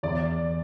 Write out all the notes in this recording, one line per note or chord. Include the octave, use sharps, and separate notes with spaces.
E2 D5